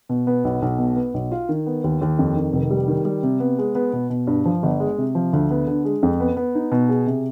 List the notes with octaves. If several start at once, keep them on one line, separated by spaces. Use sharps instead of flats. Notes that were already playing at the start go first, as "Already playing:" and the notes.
B2
B3
B1
B1
B2
B3
B1
F4
D#3
B3
D#2
D#2
F2
D#3
F1
G3
D#3
G3
C3
B3
G#3
B3
B2
B2
G2
F3
G1
G#3
C3
F3
D2
B3
D3
G#3
F2
B3
B3
D#4
B2
G#4
C3